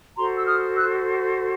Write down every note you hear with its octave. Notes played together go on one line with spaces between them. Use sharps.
F#4 A4 C5 A#5 C6
E6
D#6 F6
E6 F#6